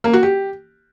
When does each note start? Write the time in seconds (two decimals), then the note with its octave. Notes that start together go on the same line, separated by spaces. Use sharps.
0.04 A#3
0.13 F#4
0.23 G4